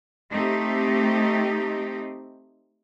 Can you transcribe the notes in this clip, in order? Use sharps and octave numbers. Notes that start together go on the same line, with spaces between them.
A3 C4 D#4 G4